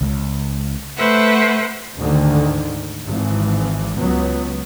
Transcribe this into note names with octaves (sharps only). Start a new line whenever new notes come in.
C#2
A3 B4 C5 E5 F#5
D2 G#2 D3 D#3
G#1 E3
C#2 F#3 B3